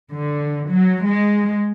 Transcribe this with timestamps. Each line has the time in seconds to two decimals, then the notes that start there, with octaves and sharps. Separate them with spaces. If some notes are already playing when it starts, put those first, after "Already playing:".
0.12 D3
0.70 F#3
1.07 G#3